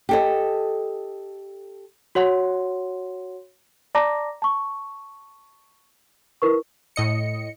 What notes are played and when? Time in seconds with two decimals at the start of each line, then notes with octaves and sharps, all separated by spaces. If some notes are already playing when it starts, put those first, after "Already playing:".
0.09 G4 A4 D#5
2.15 F#4 C#5 F#5 C6
3.95 D5 A5 A#5 D6 A#6
4.42 A5 C#6
6.42 E4 A#4 B4 C#6
6.96 A2 D#5 C#7